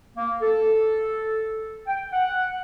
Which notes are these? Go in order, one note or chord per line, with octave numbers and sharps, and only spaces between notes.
A#3
A4
G5
F#5